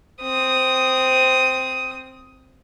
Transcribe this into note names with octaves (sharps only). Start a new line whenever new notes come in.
C4 D#6